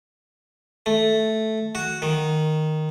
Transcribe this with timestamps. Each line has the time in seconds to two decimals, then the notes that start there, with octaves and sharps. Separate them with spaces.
0.86 A3
1.75 F#4
2.02 D#3